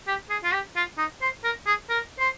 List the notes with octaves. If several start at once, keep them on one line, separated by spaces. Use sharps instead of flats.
G4
G#4
F4
G4
F4
D#4
C5
A#4
G#4
A#4
C5